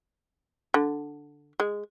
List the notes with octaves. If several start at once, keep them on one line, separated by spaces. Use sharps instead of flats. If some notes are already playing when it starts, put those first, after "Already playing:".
D3
G#3